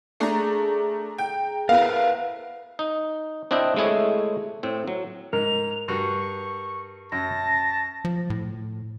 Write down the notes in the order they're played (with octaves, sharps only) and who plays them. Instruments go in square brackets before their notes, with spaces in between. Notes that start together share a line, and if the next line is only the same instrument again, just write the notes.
[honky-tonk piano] A3 D4 [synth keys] G#4 A#5
[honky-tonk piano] G5
[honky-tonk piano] B3 E4 [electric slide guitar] A#4 B4 [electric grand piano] F5
[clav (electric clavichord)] D#4
C4 D4 E4 D#5 G5
G#3 A3 E4 G#4 C#5
A2 C4
F#3
[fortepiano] G#2 [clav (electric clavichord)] A#4 [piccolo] F7
[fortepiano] G2 F#4 [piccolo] C#6
[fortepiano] F#2 [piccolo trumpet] A5 [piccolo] A#6
[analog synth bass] F3
A2